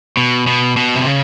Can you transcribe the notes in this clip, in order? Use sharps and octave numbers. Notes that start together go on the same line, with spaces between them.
B2
B2
B2
C3
C#3